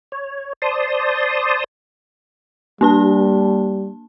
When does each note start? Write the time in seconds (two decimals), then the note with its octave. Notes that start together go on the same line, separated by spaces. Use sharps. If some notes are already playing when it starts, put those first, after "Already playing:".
0.12 C#5
0.62 C5 D5 A5 C6 D#6
2.81 G3 A#3 D4 A5